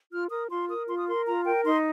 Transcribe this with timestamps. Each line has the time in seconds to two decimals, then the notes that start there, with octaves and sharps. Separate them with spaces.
0.11 F4 F6
0.31 A#4 D#6
0.51 F4 C6
0.69 A#4 D#6
0.88 F4 C6
0.98 D#6
1.08 A#4 C6
1.27 F4 A#5
1.45 A#4 G5
1.64 D#4 C6